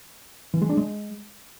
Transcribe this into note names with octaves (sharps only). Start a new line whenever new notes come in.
E3
G#3
D4
G#3